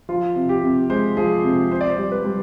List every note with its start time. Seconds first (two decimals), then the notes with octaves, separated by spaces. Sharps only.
0.09 F3 F4
0.36 C3
0.49 G4
0.63 C3
0.90 G#3 C5
1.17 F3 G#4
1.44 C3
1.71 C3 C5
1.81 D5
1.90 C5
1.98 G3
2.12 B4
2.25 G3